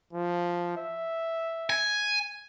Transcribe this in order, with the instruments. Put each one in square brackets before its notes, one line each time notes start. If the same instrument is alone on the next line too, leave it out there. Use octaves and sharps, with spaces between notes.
[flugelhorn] F3
E5
[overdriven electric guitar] G#5